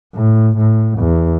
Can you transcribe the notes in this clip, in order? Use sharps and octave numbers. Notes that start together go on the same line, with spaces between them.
A2
A2
E2